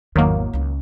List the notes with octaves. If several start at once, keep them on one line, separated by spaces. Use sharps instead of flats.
G#1 E2 D#3 F#3 A#3
C#2 C#4